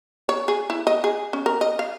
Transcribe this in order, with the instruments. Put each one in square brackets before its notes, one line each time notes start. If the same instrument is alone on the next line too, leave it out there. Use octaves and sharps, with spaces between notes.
[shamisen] C#5
G#4
E4
D#5
G#4
C#4
A#4
D#5
F5